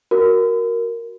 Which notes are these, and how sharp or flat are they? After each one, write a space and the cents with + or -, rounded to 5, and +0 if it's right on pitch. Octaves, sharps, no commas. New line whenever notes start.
F#4 +0 A#4 +0